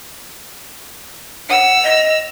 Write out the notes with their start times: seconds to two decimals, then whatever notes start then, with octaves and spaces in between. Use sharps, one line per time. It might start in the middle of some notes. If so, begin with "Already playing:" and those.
1.49 F#5 E6 F7
1.83 D#5